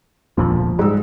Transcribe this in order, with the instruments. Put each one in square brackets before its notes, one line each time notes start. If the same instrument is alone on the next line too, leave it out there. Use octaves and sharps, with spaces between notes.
[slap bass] E1 D2 A#2 [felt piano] F3
[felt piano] G#2 E6 [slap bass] G3